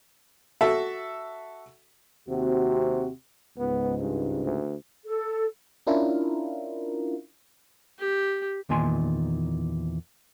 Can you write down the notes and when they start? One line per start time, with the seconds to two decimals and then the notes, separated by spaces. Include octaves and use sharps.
0.61 F#4 A4 E5
2.29 D#2 C3 C4 F#4
3.58 C#2 G#2 B3
4.01 G2
4.44 D2
5.05 A4
5.87 C#4 D4 E4 F4 A#4
7.99 G4
8.69 E2 A#2 D#3 G#5 C6